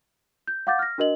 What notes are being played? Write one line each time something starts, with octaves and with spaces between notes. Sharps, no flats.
G6
F5 F#5 D6 G6 A6
F6 A#6
D4 F#4 A#4 D#5 F#7